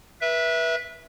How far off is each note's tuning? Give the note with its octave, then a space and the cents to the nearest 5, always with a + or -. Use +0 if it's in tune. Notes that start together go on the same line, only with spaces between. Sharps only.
B4 -30 E5 +0